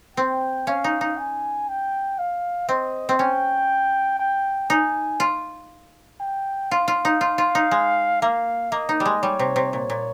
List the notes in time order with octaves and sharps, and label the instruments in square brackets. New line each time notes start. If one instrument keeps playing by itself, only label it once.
[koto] C4 [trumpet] G5
[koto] C#4 [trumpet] F5
[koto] D#4
D#4
[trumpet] G#5
G5
F5
[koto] C4 [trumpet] D#5
[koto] C4
[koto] C#4 [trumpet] G5
[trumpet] G5
[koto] D#4 [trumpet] G#5
[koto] F4
[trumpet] G5
[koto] F4 [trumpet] F5
[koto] F4
D#4
F4
F4
D#4
G#3
[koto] A#3 [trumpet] F5
[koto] A#3 [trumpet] D#5
[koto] D#4
G3
G#3
[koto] G3 [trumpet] C#5
[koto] C3
C3
[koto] A#2 [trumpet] C#5
[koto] A#2